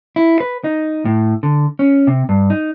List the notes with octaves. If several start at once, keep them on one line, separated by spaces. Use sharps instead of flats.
E4
B4
D#4
A2
D3
C#4
C3
G2
D#4